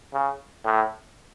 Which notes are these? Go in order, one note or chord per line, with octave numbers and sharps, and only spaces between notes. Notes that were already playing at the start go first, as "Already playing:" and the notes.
C#3
A2